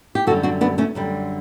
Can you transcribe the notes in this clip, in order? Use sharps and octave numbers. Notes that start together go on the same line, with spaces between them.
G4
F#2 D3 G3 F#4 A4
D4 F#4
B3 D4
A3 C#4
F#2 D3 G3